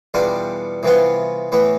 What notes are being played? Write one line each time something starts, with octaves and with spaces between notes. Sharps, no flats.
E2 B2 G3 D4 F4
C2 C3 E3 B3 F4
A2 E3 B3